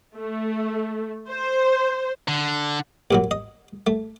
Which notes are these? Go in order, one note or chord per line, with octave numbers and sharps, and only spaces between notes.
A3
C5
D3
D#2 A#2 F#3
D#5
A3